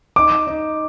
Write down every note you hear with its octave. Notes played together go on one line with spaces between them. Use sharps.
D#4 D6
D#4